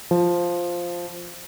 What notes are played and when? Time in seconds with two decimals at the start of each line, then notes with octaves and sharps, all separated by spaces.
0.11 F3